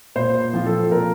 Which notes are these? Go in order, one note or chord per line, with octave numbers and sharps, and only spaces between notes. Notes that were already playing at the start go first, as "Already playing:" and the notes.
A#2 C5
F3 C4 F4
A4
A#2 A#4